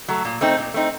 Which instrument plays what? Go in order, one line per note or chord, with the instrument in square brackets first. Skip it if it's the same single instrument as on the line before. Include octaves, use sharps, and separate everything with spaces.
[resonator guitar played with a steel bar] F#3 A3
A#2
A3 C4 D#4
A#2
A3 C4 D#4